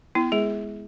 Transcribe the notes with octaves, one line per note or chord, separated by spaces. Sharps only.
B3 E4
G#3 G#4